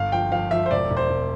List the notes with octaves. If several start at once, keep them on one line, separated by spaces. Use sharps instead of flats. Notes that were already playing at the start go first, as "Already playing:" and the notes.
Already playing: G1 F5
F3 G5
F3 F5
F3 E5
C5
E1 D5
E1
C5
E1